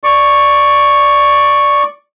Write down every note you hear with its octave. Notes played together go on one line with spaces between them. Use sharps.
D5 C#6